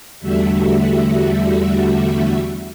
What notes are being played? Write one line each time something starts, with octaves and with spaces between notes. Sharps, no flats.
E2 D3 G3 A3 F#4 E5